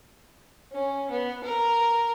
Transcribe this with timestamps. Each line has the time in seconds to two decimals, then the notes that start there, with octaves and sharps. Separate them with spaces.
0.72 C#4
1.11 B3
1.44 A#4